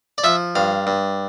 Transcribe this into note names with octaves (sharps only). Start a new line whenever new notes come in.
D5
F3 E5
G2 F5
G2